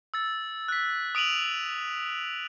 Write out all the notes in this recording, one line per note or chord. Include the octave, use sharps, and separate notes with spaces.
E6 A6
F#6 B6
D#6 D7 D#7 F7 F#7